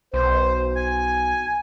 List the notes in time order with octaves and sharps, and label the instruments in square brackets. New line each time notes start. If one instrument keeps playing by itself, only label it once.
[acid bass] B1 [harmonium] C5
[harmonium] G#5